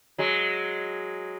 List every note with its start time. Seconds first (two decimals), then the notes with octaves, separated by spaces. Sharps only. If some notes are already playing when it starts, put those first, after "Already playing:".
0.18 F#3 G#3